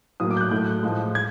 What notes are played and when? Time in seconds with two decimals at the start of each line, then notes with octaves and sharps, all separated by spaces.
0.20 A2 F#3 A#3 D#6
0.31 D6
0.37 G6
0.41 F#6
0.51 A2 F#3 A3 G6
0.83 A2 F3 G#3
1.15 G#6